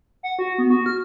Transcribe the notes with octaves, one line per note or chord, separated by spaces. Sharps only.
F#5
F#4
B3
F#4
F6